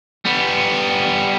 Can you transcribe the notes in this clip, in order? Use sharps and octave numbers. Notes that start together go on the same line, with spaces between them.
G3 B3